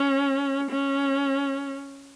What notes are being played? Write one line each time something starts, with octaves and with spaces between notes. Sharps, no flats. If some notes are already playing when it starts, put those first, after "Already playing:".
Already playing: C#4
C#4